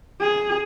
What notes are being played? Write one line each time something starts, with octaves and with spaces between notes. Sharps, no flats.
G#4